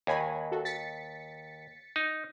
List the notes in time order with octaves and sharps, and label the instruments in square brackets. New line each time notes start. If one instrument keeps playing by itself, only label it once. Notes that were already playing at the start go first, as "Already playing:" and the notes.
[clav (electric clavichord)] D#2 [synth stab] C#5 G#5 B5
[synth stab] F#4 A4
A6 B6 C#7
[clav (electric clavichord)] D#4